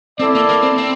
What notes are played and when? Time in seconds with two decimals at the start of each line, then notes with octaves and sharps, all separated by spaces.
0.19 C4 E4 A4 D5
0.35 A#3
0.49 A#3
0.63 C4
0.78 C4